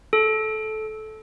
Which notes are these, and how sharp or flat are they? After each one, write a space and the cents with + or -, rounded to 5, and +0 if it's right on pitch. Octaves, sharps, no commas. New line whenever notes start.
A4 -15